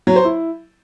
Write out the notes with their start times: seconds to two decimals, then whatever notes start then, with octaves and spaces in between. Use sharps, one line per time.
0.07 F#3
0.16 C5
0.25 E4